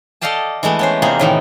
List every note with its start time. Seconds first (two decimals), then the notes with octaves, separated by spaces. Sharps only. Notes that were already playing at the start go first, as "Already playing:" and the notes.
0.21 A4 D5 D#5 F5 G5 A5
0.63 E3 G#3 A3 B3
0.79 B3 C#4 C5
1.02 E2 C3 A#3 D#4 G#4
1.19 A2 D#3 E3